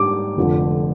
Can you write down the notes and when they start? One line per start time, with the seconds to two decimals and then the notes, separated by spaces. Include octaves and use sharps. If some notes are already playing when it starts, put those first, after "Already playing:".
Already playing: G#2 G3 D4 D6
0.37 F1 F2 D3